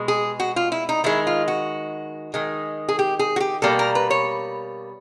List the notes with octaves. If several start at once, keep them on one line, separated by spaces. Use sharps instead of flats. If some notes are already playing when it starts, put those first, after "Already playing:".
Already playing: B2 G#3
G#4
F#4
F4
E4
D#4
D#3 G#3 E4
F4
F#4
D#3 G#3
G#4
G4
G#4
F#4
G4
B2 G3 A#3 A4
A#4
B4
C#5